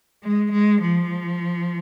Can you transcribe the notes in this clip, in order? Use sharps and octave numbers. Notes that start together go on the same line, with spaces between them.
G#3
G#3
F3